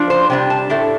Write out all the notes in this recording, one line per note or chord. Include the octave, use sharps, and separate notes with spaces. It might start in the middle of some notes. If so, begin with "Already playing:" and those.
Already playing: F3 D4
C5
C3 G3 D4 G5
A5
A2 A3 D4